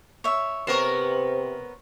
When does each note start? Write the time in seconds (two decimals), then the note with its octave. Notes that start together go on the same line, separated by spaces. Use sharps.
0.24 C#5 E5
0.67 C3 B3 A#4 C5 C#5